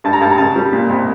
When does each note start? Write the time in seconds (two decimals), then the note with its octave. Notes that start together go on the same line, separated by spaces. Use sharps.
0.04 G2 A5
0.13 A#5
0.21 G2 A5
0.30 A#5
0.38 C#3 A5
0.56 G3
0.73 A#2
0.89 C2